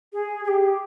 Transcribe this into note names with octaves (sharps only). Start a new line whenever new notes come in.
G#4
G#4
G4